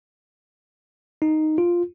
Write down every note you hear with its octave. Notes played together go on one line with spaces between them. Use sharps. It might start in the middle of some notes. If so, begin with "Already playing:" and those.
D#4
F4